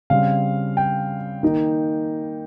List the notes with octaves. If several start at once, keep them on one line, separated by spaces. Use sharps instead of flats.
C#3 G3 C4 F5
G5
D#3 A#3 D#4